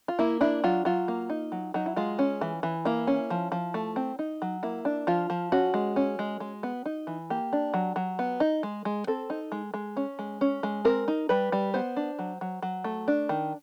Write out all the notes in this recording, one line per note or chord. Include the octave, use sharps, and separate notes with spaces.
F4
A#3 E4
D4 E4
F#3 F4
F#3 F4
A#3
D#4
F#3
F#3 D#4
E4
G#3 F4
C#4
E3
E3
A#3 E4
C#4
F3
F3
A3
C4
D#4
F#3
A#3 E4
D4
F3 F4
F3
C#4 F#4
G#3
C#4
G#3
G#3
B3
D#4
E3
A#3 G4
D4
F#3
F#3
B3
D#4
G#3
G#3
C4 A4
D#4
G#3
G#3
C#4
G#3
C#4
G#3
C4 A#4
D#4
G3 B4
G3
B3 C5
D4
F#3
F#3
F#3
A3
D4
D#3